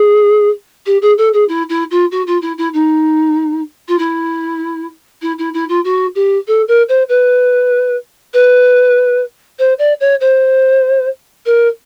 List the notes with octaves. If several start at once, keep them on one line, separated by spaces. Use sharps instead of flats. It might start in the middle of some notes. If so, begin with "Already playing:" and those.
Already playing: G#4
G4
G#4
A4
G#4
E4
E4
F4
F#4
F4
E4
E4
D#4
F4
E4
E4
E4
E4
F4
F#4
G4
A4
A#4
C5
B4
B4
C5
D5
C#5
C5
A#4